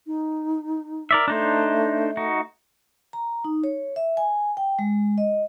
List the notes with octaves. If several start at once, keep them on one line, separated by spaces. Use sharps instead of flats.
D#4
A#4 D5 E5
A3 D4 D#4 C5
D#4 F#4
A#5
D#4
C#5
E5
G#5
G5
G#3
D#5